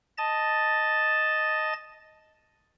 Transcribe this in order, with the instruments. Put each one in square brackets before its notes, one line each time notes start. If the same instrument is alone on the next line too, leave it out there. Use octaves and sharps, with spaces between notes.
[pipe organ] D#5 A5 A6